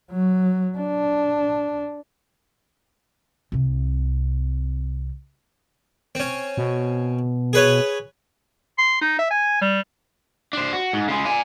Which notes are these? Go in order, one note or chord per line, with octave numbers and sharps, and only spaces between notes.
F#3
D4
C2 C3
C4 C#4
B2
G#4 B4 C#5
C6
D#4
E5
G#5
G3
D4 C5
F#4
G#2
C#3 G#3
D5 G#5